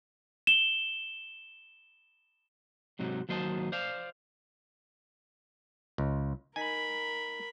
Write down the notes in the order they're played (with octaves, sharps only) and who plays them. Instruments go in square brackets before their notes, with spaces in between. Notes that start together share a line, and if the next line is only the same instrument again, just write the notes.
[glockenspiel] E7 G7
[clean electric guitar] G#2 C3 F#3 D#4
D#2 F#3 C5 D#5 E5 A5
C5 D5 F5
[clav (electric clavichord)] C#2
[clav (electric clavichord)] D#4 G#5 [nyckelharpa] A#4 B5